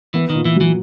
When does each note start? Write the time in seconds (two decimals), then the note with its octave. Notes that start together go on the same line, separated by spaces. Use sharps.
0.14 E3 B3
0.30 D#3
0.35 A#2
0.45 E3
0.56 E3 F#3